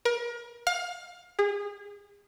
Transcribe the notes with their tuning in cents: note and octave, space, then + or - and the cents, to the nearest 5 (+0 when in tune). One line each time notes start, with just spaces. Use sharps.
A#4 +35
F5 +25
G#4 -30